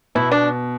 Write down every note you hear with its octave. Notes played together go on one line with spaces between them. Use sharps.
B2 E4
D4